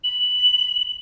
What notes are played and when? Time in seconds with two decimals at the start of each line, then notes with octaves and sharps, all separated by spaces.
0.04 F#7